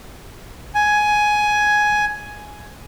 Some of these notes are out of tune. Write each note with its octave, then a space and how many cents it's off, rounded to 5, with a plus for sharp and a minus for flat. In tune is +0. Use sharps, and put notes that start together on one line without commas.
G#5 +10